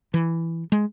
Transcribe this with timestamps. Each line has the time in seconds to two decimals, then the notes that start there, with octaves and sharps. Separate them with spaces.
0.14 E3
0.72 G#3